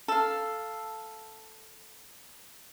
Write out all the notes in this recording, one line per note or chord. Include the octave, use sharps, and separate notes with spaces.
A4 F5